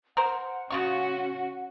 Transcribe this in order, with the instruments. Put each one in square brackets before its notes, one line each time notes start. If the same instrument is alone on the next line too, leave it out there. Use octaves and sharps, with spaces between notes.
[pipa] A#4 C5 [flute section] F#5
[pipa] C#3 F4 C#6 [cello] C#4 F#4